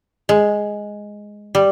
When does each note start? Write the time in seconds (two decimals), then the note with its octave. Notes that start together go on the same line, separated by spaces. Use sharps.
0.29 G#3
1.55 G3